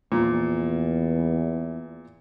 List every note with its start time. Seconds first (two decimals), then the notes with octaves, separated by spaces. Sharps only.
0.12 E2 A#2 F3